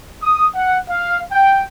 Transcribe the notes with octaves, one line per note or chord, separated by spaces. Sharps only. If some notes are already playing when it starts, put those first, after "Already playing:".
D#6
F#5
F5
G5